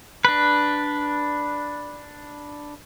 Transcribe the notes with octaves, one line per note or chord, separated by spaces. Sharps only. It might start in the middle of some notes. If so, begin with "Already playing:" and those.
D4 B4